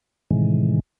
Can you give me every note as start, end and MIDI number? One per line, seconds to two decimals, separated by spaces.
0.31 0.80 45
0.31 0.80 48
0.31 0.80 51
0.31 0.80 52
0.31 0.80 56